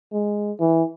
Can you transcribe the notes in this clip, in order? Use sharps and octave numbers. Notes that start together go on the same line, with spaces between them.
G#3
E3